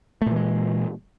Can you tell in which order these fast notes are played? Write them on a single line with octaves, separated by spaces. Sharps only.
A3 A#2 E3 G#3